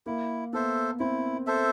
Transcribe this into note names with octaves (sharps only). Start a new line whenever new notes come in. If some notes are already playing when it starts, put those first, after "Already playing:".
A#3 E4
B3 A4 C5 E5
C4 E4
A4 C5 E5